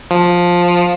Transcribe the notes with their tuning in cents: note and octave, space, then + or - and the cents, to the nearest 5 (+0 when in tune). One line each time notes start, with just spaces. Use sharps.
F3 +10